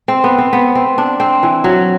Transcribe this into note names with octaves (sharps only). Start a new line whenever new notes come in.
C4
B3
C4
B3
C4
D4
C4
E3
F#3